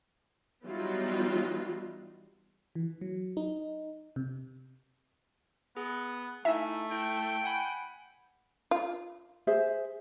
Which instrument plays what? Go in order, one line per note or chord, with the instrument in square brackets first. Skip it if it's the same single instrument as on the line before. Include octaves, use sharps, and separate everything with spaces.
[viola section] E3 F#3 G3 B3 D#4 F4
[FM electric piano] E3
F#3
D#4
C3
[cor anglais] B3 [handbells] G#4
[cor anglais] A3 [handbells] D#4 E4 G#5 [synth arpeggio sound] E5
[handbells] E4 [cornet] G5
[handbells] F#5 G#5 B5
[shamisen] F4
[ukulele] G#4 C5 E5